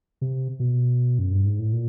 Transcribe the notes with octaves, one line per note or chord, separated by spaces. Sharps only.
C3
B2
F#2
G2
G#2
A2
A#2